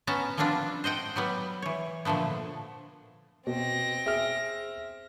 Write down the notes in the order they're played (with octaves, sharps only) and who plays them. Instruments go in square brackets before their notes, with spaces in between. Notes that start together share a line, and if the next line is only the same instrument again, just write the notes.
[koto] B3 C#4 A5 A#5
F3 G3 B3 C4 D4 F4
C5 D#5 F#5 G5
F#3 G3 B3
E3 C#5
A#2 D3 F3 A3 B3
[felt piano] B2 [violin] C4 A#6
[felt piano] G#4 [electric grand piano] E5 F6 D7